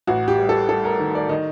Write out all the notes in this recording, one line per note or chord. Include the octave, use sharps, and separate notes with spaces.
A1 F#4
G4
G3
A4
G3 A4
A#4
D#3
D5
D#3 D#5